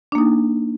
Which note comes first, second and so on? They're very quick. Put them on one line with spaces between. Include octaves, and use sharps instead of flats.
D4 A#3 D#4